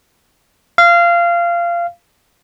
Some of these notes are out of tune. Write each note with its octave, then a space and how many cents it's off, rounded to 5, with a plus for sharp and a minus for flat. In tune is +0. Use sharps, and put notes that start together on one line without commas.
F5 -20